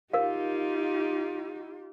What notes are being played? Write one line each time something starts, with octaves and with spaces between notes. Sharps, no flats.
D#4 F4 G4 A#4 F5